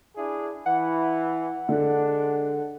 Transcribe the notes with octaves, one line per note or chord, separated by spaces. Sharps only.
D4 E4 G#4
E3 F#5
D3 G#3 D4